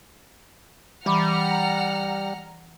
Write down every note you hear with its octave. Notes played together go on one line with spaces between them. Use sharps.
E3 G3 F#5 A#5 B5 D6 F6